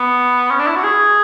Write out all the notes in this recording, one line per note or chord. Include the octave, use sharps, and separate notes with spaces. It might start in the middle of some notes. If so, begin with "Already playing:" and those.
Already playing: B3
C#4
D4
E4
F#4
G#4